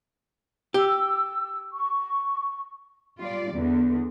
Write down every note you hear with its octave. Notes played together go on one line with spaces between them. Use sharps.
G4 E6
C#6
G3 F4 D5
E2 D3